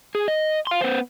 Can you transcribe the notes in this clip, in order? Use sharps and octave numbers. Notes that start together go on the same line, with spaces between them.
G#4
D#5
F5 C6
B3 C5